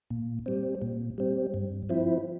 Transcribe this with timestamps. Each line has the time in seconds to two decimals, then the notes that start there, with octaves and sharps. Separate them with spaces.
0.10 A#2
0.46 G3 C4
0.82 A#2
1.18 G3 C4
1.54 G2
1.89 F3 C4 E4